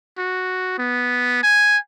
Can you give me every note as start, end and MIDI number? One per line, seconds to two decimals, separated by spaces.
0.18 0.76 66
0.78 1.42 59
1.43 1.77 80